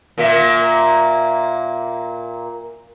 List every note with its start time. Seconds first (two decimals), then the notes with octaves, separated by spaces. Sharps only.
0.18 A#2 A#3 E5